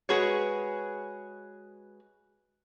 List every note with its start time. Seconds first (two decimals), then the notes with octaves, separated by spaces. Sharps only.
0.09 G#3 F#4 G#4 B4 C#5